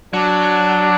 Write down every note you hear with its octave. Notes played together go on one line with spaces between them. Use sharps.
F#3 D4